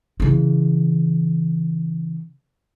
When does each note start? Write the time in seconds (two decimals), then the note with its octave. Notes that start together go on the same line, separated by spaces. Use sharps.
0.20 C#3 E3